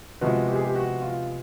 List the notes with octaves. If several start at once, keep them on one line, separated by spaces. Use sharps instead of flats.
C3 F3 G#3 B3 F#4
G4
G#4
G4
F#4
F4